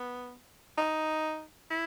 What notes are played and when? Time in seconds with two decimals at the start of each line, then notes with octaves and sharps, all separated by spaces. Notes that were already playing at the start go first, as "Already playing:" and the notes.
Already playing: B3
0.78 D#4
1.71 E4